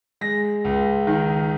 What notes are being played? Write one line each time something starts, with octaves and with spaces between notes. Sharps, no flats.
G#3 A#6
C#2
D#3